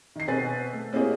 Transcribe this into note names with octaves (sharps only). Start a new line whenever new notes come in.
D#3 C7
B2 C4 B4 G#5 A6
A3
A#3 C4 E4 G4 G#4 C#5